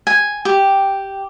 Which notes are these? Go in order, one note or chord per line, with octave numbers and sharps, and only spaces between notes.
G#5
G4